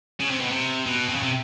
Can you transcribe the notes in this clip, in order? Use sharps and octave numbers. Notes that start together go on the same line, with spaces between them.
C#3
C3
B2
C3
B2
C3
C#3
C3